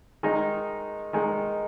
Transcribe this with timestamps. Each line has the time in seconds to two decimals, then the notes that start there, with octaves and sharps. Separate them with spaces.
0.23 D#3 G#3 D#4
1.13 D#3 G#3 D#4